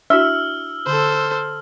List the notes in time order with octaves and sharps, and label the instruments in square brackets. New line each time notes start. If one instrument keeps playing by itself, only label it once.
[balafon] D4 E4 F#4 [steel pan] E5 [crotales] E6 F6
[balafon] D3 [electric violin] A4 C5